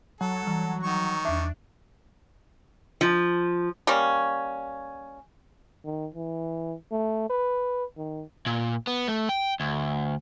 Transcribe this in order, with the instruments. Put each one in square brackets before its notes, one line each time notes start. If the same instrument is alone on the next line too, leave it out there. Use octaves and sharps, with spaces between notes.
[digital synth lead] F#3 [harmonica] A4
[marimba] E3 G3
[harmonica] D#3 C#6
[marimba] E2 E5 [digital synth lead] D4
[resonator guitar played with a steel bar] F3
[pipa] G3 A#3 C#4
[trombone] D#3
E3
A3
B4
D#3
[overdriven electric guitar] A#2
B3
A3
G5
D2